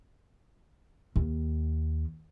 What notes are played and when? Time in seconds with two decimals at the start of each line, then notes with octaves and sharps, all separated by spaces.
1.16 D#2